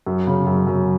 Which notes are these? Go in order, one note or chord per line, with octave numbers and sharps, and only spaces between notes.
F#2
C#3
F#2
F#2